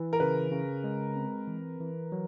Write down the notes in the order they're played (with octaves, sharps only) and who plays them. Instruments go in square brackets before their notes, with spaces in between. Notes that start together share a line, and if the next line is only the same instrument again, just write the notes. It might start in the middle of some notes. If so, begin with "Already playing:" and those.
Already playing: [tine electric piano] E3
[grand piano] A#4
[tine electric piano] C#3 [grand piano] B4
[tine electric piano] C#3
G#3
C4
E3
E3
F#3